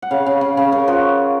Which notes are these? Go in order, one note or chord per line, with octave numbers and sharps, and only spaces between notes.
F#5
C#3 F5
C#3
C#3
C#3
C#3 A#4
F3 F#4